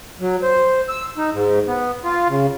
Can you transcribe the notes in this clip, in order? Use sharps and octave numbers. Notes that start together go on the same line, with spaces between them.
F#3
C5
E6
D#4
G#2
B3
F4
C#3